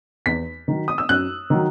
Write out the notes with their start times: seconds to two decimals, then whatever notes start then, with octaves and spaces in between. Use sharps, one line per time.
0.26 E2 B6
0.68 D#3 F#3
0.88 D#6
0.98 E6
1.09 F#2 F#6
1.50 D#3 F#3